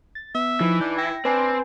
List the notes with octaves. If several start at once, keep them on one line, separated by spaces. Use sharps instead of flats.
A6
B3 E5
E3 F3 D#4
D4 G6
E4 G5 A#6
C4 D4 B4 G#5